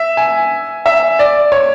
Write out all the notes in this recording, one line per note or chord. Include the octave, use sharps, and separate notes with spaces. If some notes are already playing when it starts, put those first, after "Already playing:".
Already playing: E5
G#5
E5
D5
C#5